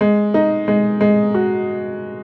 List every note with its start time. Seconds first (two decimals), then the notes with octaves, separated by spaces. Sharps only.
0.01 G#3
0.34 D#4
0.68 G#3
1.01 G#3
1.34 F#4